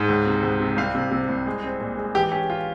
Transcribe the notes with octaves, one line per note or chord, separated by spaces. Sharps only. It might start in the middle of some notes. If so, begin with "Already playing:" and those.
Already playing: G#2
C#2
C3
C#2
C3
C2 F5
C3
C3
C2
G#3
C4
A#2
G#3
E3 G4
C#4 G4
F4